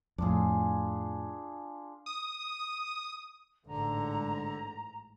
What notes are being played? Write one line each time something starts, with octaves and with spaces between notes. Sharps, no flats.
F2 A2 D4 F4 G#4
D#6
A1 G#2 D3 A#5